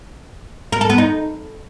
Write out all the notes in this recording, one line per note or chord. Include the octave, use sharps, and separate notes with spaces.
A#4
A4
B3
D#4